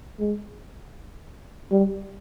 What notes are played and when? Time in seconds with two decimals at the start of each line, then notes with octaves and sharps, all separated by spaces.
0.20 G#3
1.71 G3